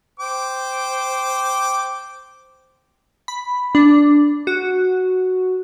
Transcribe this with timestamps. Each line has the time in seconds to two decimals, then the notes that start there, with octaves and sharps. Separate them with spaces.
0.20 C5 G5 D6
3.28 B5
3.75 D4
4.47 F#4